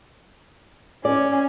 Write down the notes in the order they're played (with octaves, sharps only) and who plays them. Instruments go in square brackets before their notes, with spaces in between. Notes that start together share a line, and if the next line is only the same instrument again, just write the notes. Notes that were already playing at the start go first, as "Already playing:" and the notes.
[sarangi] C#4 [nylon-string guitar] D5